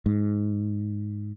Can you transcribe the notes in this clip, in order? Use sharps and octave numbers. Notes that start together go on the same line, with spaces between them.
G#2